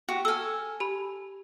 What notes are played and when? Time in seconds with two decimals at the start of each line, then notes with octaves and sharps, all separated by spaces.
0.08 F#4 G4
0.25 A4 G#5 E6 F6
0.80 G4 B5